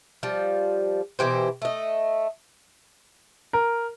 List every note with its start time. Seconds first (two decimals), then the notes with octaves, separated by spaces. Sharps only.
0.23 F3 G3
1.19 B2 E3 G4 C5
1.62 A3 D#5
3.53 A#4